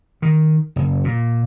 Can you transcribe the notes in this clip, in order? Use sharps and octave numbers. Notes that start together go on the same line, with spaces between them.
D#3
F#1
A#2